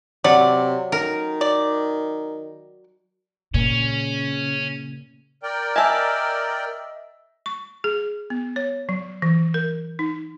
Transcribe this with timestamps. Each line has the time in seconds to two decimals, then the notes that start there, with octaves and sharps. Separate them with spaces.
0.24 C3 F#3 D5
0.92 D#3 A#4
1.41 D5
3.54 A#2 C#3 C#4
5.43 A#4 D5 G5
5.76 D#5 E5 G#5 A5 E6
7.46 C#6
7.84 G#4
8.30 B3
8.56 C#5
8.89 F#3
9.22 E3
9.54 A#4
9.99 D#4